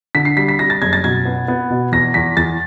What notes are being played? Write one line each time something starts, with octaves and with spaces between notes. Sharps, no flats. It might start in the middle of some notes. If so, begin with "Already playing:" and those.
D3 B6
C7
G3 B6
B6
G3 A#6
A6
F#1 G#6
A6
B2 G#6
B3
B3
B2
E2 A#6
E2 B6
E2 A6